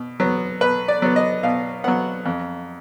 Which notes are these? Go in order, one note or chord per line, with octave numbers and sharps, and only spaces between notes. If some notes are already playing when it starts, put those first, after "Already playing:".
Already playing: B2
F#3 B3
B2 B4
D5
F#3 B3
D#5
B2 F5
F#3 B3 F#5
F2